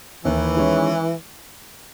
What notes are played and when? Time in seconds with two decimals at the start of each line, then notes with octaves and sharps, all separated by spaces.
0.25 D#2 E3
0.57 D#3 G#3 C#4